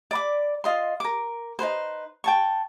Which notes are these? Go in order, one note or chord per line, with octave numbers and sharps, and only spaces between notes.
D5 B5 D6
F4 D#5 C6
A#4 D6
D#4 G#4 B4 C5
G5 A5 C#6